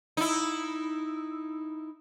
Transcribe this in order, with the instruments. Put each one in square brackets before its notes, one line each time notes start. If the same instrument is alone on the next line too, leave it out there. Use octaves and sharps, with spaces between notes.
[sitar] D#4 E4